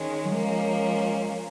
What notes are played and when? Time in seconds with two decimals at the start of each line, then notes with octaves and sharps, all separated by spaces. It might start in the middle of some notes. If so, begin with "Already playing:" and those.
Already playing: D#3 G#3 C#4
0.25 F#3
0.32 F3 G#3 A#3 C#4